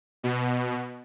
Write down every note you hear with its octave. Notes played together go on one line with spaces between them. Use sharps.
B2